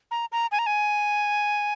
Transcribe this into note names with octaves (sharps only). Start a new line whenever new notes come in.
A#5
A#5
G#5
A#5
G#5